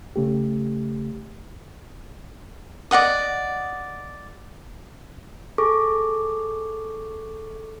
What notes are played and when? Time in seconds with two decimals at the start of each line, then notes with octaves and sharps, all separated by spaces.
0.16 C#3 A3 G4
2.91 D5 D#5 F#5 D#6
5.58 G#4 A4 C#6 D6